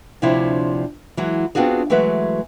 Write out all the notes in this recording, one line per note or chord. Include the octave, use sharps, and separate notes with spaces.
D2 C3 F3 D4 E4 C#5
E3 F#3 G#3
B3 C4 D4 F4 F#4 G#4
E3 F#3 G#3 A3 B4 E5